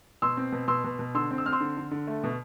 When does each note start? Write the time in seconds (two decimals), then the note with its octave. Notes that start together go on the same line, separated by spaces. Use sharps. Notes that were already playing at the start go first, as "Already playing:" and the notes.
0.22 B2 C6 E6
0.37 C4
0.52 B2
0.68 B2 C6 E6
0.84 B2
0.99 B2
1.15 D3 C6 E6
1.31 C4
1.38 E6
1.46 C4 F6
1.52 C6 E6
1.61 D3
1.77 D3
1.91 D3
2.07 A3
2.24 B2